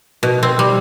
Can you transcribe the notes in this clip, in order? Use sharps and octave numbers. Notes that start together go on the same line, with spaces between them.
B2
C4
G3